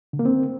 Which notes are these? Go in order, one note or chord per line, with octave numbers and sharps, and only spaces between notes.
D3
A#3
C4